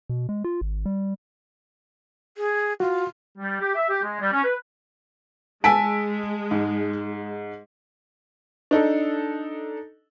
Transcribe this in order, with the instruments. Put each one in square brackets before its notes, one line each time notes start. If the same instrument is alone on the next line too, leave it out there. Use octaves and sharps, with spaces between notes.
[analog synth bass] B2
G#3
F4
G#1
G3
[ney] G#4
[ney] F4 [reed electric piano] F#4
[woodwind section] G3
G4
E5
G4
G#3
G3
C#4
B4
[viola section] G#3 [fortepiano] G#5 A5 [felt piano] E6 B6 D7
[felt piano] G#2
[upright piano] D4 D#4 A4